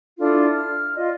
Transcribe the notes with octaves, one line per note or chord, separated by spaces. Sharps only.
D4 E4 F4 A4
F6
F4 D5 D#5